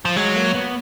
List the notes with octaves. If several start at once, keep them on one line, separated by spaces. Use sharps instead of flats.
F3
F#3 G#3
A#3
B3